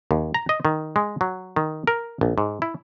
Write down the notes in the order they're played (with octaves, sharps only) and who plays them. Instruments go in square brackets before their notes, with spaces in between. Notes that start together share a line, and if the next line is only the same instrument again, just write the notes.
[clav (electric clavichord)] D#2
A#5
D#5
D#3
G#3
F#3
D#3
A#4
A#1
G#2
E4